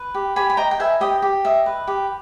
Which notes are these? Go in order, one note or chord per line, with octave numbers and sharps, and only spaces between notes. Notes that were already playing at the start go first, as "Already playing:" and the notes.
Already playing: B4
G4
G4 G#5 B5
B5
D#5 G5 A#5
G5
B4 E5 G#5
G4 D#5 G5
G4
D#5 E5
B4
G4